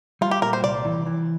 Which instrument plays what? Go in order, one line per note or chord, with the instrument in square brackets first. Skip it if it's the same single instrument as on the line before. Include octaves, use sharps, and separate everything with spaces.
[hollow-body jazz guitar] G3 [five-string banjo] F4
[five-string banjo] G4
[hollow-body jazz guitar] A#2 [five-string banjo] A#4
[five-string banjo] C5
[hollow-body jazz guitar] C2 [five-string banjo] D5
[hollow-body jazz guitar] E3
E3